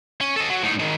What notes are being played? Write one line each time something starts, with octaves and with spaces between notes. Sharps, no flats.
C#4
A4 D#5
F#3
A2 D#4
D#3 G#3